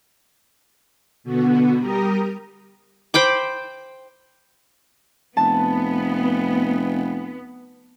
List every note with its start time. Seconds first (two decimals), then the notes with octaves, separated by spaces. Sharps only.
1.23 B2 D3 B3 F#4
1.80 G3 G4 A#4 A#5 D#6
3.14 C5 G5 B5 D6
5.37 F1 B3 A5